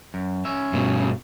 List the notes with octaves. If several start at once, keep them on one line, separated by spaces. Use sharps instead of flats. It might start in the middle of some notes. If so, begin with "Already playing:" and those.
F#2
C#4 E5
G2 B2